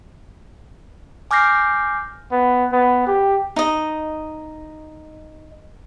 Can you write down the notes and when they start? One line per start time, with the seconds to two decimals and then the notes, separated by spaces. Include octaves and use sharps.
1.31 G#5 D6 F6 G6 A#6 C7
2.32 B3
2.73 B3
3.07 G4
3.56 D#4 D#5